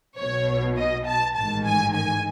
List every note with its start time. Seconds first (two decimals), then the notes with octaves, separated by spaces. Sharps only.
0.17 B1 B2 C#5
0.76 D#5
1.06 A5
1.35 A1 G#2 D#3 A5
1.65 G#5
1.94 G#5